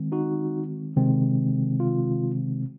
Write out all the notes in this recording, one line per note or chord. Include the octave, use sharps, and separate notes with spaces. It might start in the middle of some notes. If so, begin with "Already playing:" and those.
Already playing: D#3 G#3 C4
D#4 F#4
C3 D#3 G#3 C4
F4